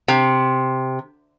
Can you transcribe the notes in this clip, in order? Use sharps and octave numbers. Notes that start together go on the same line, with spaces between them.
C3